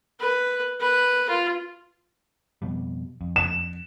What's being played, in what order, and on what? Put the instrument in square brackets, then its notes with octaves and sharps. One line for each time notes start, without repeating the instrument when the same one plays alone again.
[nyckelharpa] B4
B4
F4
[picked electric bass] F2 B2 G3
F2
[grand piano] E7